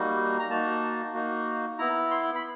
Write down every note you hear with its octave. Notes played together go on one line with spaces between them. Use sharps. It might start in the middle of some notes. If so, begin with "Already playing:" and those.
Already playing: G3 A#3 D#4 F#4
A#5
A#3 D#4 F#4 A5
A#3 D#4 F#4
B3 E4 A#5
C6
B5